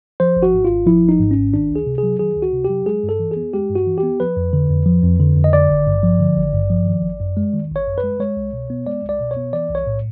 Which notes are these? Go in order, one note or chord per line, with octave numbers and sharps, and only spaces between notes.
F3 C5
G#1
F#4
G#2
F4
G#1
F3 E4
G#1
D#4
G#2
C#4
G#1
D#3 D4
C#2
G#4
C3
G#4
F#3
D#3 G#4
C#2
F#4
C3
G4
F#3
G#3 G#4
G2
A4
E3
G#4
B3
G#3 G4
G2
F#4
E3
G4
B3
F3 B4
F2
D3
F2
F3
F2
D3
F2
D#5
D3 D5
G#1
G2
F3
D3
G#1
G2
F3
D#3
G#1
F#2
G#3
D#3
G#1
C#5
F#2
B4
G#3
G#3 C#5
C2
B2
B3
G#3 D5
C2
D5
B2
C#5
B3
E3 D5
B1
C#5
A2